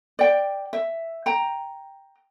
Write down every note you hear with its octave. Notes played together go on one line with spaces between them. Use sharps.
D5 G5
E5
G5 A#5